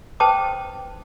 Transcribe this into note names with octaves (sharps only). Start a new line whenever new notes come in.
B4 C5 G5 A5 D6 D#6